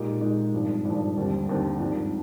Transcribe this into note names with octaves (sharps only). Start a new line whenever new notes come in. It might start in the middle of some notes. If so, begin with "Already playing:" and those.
Already playing: A#2 G#3 D#4 G4
A#2 G#3 D#4 G4
G#1 G2 F3
G#1 G2 F3
D#2 D3 G3 C4
D#2 D3 G3 C4
G#1 G2 F3